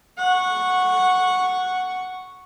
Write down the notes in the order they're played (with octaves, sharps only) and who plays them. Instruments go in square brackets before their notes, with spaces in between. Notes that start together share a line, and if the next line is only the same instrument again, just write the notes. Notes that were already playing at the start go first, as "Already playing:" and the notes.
[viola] F#5 C#6